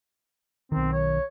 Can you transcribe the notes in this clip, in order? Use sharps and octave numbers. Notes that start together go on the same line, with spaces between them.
B1 D#3 C4
C#5